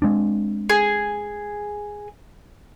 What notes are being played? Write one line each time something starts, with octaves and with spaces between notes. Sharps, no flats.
G#3 C4 D4
G#4